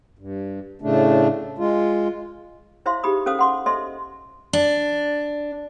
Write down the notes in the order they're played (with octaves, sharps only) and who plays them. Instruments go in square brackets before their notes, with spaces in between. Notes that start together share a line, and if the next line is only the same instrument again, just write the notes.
[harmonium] G2
A2 C#3 A3 D4
G#3 F4
[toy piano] E4 C5 E5 F5 C6
D#4 G4 G#4 B5 D#6
C#4 A4 C5 F5 D#6
F#5 C6 D6
A4 C5 D#5 E5 C6
[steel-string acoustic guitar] D4